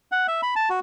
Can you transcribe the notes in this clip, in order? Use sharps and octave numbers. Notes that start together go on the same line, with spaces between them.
F#5
E5
B5
A5
F#4